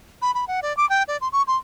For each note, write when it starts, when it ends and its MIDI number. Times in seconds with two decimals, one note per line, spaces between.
0.22 0.34 83
0.34 0.45 83
0.48 0.60 78
0.62 0.75 74
0.77 0.88 86
0.89 1.03 79
1.08 1.17 74
1.21 1.28 84
1.32 1.42 85
1.47 1.57 84